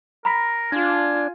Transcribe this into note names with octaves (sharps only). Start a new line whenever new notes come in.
A#4 A#5 B5 B6
D4 F4 G#5